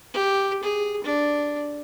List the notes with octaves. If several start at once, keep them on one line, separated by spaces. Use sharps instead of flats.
G4
G#4
D4